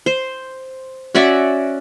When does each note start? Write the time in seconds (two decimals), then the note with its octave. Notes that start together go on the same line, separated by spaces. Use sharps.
0.06 C5
1.15 C#4 F#4 D5 E5